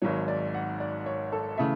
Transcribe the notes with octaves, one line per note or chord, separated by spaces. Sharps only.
G#1 G#2 F#3 C#5
D5
F#5
D5
C#5
A4
C#3 E3 A3 E5